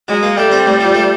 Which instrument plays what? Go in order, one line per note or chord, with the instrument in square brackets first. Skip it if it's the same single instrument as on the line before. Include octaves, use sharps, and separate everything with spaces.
[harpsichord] F#3 [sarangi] G#3
[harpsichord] A#3
[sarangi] G3 [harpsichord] A3
[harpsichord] C4
A2
F3
A3